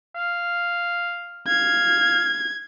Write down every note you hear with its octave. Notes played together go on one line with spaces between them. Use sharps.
F5
F5 G#6